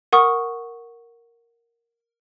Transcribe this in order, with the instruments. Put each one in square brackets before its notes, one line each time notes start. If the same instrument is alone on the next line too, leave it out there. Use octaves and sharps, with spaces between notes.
[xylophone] A#4 F#5 C#6 D#6